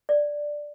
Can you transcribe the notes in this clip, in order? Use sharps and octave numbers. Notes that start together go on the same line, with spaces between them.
D5